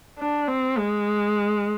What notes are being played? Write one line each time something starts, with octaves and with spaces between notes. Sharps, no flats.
D4
C4
G#3